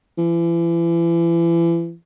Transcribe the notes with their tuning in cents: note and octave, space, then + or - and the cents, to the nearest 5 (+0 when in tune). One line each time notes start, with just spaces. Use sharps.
E3 +35